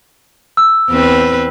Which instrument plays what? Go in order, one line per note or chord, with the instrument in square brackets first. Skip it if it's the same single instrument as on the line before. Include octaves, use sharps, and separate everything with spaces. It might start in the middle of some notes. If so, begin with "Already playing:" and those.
[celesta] E6
[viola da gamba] E2 C4 B4